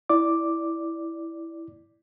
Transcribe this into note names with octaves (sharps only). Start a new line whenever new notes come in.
E4 D5 D6